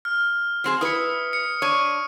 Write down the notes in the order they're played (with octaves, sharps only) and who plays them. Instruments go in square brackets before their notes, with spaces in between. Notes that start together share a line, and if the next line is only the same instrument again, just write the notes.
[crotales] F6
[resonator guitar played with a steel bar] F#3 C4 G#4
[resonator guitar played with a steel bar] E4 B4 [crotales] D#6 C#7
[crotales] C#7
[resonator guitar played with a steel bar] D4 C#5 [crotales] C#6 D#7